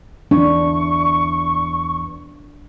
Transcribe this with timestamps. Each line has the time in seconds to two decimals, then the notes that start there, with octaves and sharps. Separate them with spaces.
0.31 E2 D4 C#6